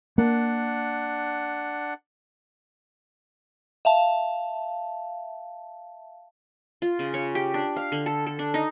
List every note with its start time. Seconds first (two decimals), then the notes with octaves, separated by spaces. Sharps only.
0.18 A#3 D4 F#5
3.85 E5 F5 A5
6.82 F4
6.99 C#3
7.14 C#5
7.35 G4
7.54 D4
7.76 F5
7.92 D3
8.06 A4
8.27 A4
8.39 D4
8.54 D#4